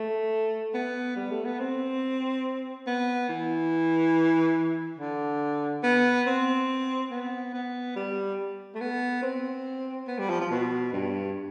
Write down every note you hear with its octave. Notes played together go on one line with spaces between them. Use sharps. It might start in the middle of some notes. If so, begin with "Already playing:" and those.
Already playing: A3
B3
G3
A3
B3
C4
B3
E3
D3
B3
C4
B3
B3
G3
A3
B3
C4
B3
G3
F3
F3
B2
G2